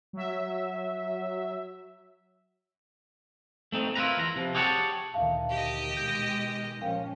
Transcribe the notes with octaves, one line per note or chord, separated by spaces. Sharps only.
F#3 E5
A3 C4 D#4
E4 F4 A#4 B4 A#5
E2 A#5
C3 F3
G4 G#4 C#5 F#5 G5 A5
D2 A#2 D#3 E5 F5 A5
G4 D#5
B2 D#3 G#3 G6
A#2 F3 C#4 A#4 F5 G5